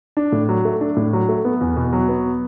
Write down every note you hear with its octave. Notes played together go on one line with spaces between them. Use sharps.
D4
A2
F#3
A3
D4
A2
F#3
A3
B3
E2
B2
F#3
B3